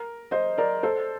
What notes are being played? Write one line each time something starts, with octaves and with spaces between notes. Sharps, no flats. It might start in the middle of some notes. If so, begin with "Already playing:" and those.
Already playing: A#4
C5 D#5
A#4 D5
A4 C5